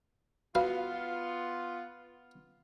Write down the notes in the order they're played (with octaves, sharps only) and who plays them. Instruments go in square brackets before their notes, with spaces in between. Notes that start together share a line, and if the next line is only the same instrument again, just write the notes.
[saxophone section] B3 F4 [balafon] F#4 [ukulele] B4 [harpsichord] F5